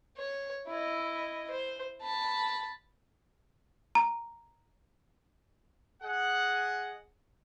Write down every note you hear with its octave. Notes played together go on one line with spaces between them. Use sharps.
C#5
E4 D#5
C5
A5 B5
A#5
G#4 D#5 F#5